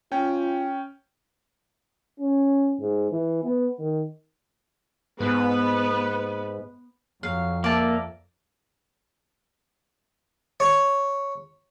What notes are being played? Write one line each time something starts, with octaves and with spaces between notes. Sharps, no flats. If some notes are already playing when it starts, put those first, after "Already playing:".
C#4 F4 G5
C#4
G#2
E3
B3
D#3
G#2 B3 B4
F2 F#3 F5
A#3 D5 E5 A5
C#5